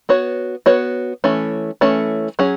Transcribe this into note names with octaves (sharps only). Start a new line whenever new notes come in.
B3 F#4 C#5
B3 F#4 C#5
E3 A3 C#4
E3 A3 C#4
F#3 C#4 G#4